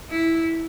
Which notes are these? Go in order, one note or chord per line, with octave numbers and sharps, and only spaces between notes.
E4